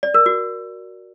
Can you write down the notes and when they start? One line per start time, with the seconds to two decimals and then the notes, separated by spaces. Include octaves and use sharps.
0.03 D5
0.14 A#4
0.26 F#4